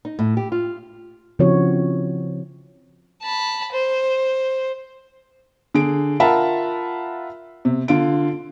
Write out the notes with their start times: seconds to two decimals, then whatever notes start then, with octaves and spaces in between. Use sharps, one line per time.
0.05 D#4
0.19 A2
0.37 G4
0.52 F4
1.39 C#3 F3 C4 E4 F#4 C#5
3.22 A5 B5
3.72 C5
5.74 D3 G#4 D7
6.20 F4 A#4 E5 F#5 A5 B5
7.65 C3
7.88 D3 F4 D7